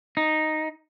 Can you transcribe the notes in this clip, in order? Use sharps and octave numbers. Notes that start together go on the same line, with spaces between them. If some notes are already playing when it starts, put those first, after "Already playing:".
D#4